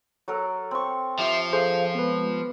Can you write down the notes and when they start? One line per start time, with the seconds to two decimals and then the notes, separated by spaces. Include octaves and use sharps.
0.28 F#3 A4 A#4
0.71 C4 C#6
1.18 F3 F4 G4 E5
1.53 G#4 A4 C5 F5
1.95 G#3 B3 B4